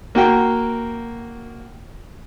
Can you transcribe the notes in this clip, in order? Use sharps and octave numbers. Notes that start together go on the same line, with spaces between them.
A#3 F#4 G5